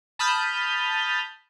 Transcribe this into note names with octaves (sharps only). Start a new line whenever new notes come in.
A5 B5 D#6 F6 G6